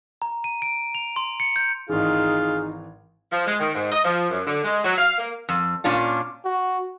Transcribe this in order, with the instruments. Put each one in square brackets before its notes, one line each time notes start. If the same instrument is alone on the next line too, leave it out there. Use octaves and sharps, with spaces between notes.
[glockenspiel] A#5
D#7
D7
F7
C6
C#7
G6
[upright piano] G#1 E3 [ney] D#4 [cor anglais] F4 [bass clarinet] G#4
[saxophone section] F3
G#3
D#3
G#2
D#5
F3
F#2
D3
G#3
F#3
F5
A#3
[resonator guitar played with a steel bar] F2
A#2 C#4 D4 F4
[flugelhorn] F#4